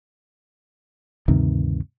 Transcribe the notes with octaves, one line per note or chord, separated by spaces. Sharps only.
D2 G2 C3 D#3